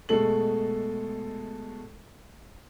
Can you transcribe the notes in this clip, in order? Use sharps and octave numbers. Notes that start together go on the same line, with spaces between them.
B2 G#3 A3 A4 F#7